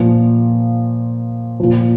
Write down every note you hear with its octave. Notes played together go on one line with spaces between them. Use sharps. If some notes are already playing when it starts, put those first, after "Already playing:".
Already playing: A#2 F3
A#2 F3